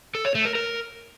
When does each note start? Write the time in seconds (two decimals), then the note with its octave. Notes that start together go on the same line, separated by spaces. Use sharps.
0.15 A4
0.25 C#5
0.35 A3
0.45 A#4
0.55 A#4